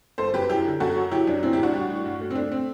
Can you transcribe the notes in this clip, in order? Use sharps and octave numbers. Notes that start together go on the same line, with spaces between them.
G1 A4 C5
F#2 G4 B4
F#2 E4 G4
D3
F#2 F#4 A4
F#3
F#3 E4 G4
F#2 D4
A2 C4 E4
E4 G4
A1 D4 F#4
G3
A2
G2
A3
C4
A3 D4
C4